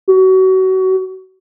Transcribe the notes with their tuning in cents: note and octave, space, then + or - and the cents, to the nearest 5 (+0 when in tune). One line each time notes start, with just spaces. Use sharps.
F#4 +30